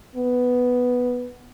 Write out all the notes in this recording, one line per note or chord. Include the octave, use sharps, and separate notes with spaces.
B3